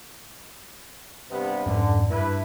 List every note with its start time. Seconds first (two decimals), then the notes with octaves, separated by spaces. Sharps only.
1.30 G2 C3 B3
1.66 F2 G#2 D3 C#4
2.10 G2 E4 B4